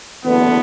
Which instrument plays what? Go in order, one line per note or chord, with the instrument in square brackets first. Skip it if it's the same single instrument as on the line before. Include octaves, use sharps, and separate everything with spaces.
[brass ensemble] F#1 E2 D3 A3 B3